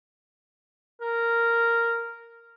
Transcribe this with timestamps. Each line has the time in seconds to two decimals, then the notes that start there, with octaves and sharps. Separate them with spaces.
1.01 A#4